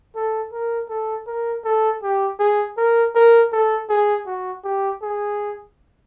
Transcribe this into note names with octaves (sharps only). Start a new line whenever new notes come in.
A4
A#4
A4
A#4
A4
G4
G#4
A#4
A#4
A4
G#4
F#4
G4
G#4